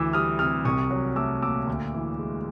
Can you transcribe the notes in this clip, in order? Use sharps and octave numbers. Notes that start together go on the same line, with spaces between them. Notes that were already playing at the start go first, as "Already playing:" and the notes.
Already playing: D2 E3 D6 E6
G3 D#6 F6
C3 D#6 F6
C2 C#6 D#6
F#3
A3 D6 E6
A#2 D6 E6
D2
E3
G#3